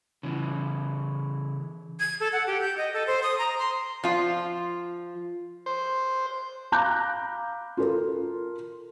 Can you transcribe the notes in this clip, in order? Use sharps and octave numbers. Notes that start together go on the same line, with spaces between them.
C#3 E3
G#6
A4
F#5
G4
G6
D#5
A4
C5
D#6
A#5
C6
F3 F4
C5
F5 A#5 B5 D6 F#6 G6
F4 A4 A#4